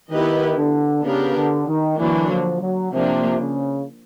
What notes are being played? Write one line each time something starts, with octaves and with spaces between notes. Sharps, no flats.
D#3 B3 E4 G4 B4 D#5
D3
C#3 B3 D4 G4 A#4
D3
D#3
D3 E3 F#3 A#3 D4
F3
F#3
C3 F3 A#3 D4
C#3